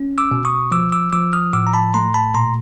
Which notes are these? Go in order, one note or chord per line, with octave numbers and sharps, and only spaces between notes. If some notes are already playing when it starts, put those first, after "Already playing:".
Already playing: C#4
D6 E6
B2
C#6 D#6
F3 D6 E6
D6 E6
F3 D6 E6
D#6 F6
A2 D6 E6
A#5
A5 B5
A3 A#5 C6
A5 B5
A#2 A#5 C6